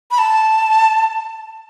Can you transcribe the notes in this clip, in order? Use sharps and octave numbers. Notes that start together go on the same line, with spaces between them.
B5
A5